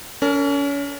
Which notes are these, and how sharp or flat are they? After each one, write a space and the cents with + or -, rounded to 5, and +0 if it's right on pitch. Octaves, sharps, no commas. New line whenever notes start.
C#4 +35 A#4 -30